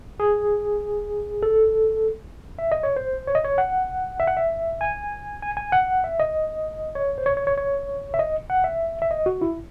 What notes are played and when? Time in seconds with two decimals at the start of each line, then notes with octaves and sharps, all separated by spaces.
0.20 G#4
1.43 A4
2.59 E5
2.72 D#5
2.83 C#5
2.96 C5
3.27 C#5
3.35 D#5
3.45 C#5
3.58 F#5
4.20 E5
4.27 F#5
4.37 E5
4.81 G#5
5.42 G#5
5.57 G#5
5.72 F#5
6.04 E5
6.20 D#5
6.95 C#5
7.18 C5
7.26 C#5
7.37 C#5
7.47 C#5
7.57 C#5
8.14 E5
8.19 D#5
8.50 F#5
8.64 E5
9.02 E5
9.11 D#5
9.26 F#4
9.41 E4